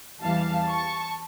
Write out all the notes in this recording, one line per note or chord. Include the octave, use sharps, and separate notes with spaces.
E2 E3 G3 F5 A5
A5 C#6